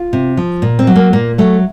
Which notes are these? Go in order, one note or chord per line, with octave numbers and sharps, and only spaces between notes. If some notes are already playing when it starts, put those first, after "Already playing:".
Already playing: F4
C3
F3
A#2
C4
F#3
A#3
A#2 A#3
F#3 A3